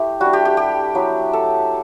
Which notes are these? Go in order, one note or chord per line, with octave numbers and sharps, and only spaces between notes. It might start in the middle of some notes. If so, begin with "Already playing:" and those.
Already playing: A3 E4 G4
G3 D4 F#4
G4
G4
G4
F#3 B3 E4
A4